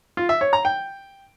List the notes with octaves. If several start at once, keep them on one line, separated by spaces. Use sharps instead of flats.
F4
E5
C#5
A#5
G5